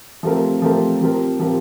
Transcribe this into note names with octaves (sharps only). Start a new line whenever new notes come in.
F3 A3 C4 G4 A#4
F3 A3 C4 G4 A#4
F3 C4 G4 A#4
F3 C4 G4 A#4